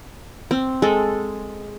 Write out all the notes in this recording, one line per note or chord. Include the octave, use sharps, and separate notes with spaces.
C4
G#3 A4